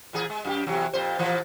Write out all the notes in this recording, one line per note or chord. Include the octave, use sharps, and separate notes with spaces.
A#2 E3 G#4
G#3
F#2 F#4 G4
E2 C3 F#3
F2 A#2 C5
A#2 E3 F3